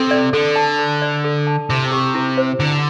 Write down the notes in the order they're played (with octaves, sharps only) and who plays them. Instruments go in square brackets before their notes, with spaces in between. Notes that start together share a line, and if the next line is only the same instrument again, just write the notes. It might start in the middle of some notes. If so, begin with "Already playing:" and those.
Already playing: [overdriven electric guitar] C3 [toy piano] A4
[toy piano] D5
[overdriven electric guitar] D3 [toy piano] A4
[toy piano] A5
A4
D5
A4
A5
[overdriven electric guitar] C3 [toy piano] E4
[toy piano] G4
E4
C5
[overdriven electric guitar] D3 [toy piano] E4